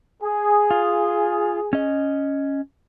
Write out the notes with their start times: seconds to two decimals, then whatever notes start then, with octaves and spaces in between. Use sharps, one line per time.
0.23 G#4
0.71 F4
1.73 C#4 D#5